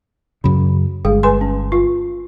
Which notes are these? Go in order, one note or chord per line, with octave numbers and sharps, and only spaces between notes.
F#2 C#3 B5
G1 G#3 G#4
B4 G#5 C6
C#4
F4